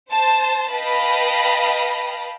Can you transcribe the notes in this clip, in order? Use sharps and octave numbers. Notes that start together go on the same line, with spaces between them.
C5 A5
B4 D#5 F5 G5 A5 B5